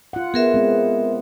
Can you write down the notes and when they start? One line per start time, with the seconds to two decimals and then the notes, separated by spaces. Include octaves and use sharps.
0.13 F4 F#5
0.34 B3 G#4 A#4 E5
0.54 G#3 C4